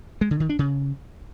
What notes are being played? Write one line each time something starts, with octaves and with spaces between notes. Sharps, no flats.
G#3
D3
D#3
D4
C#3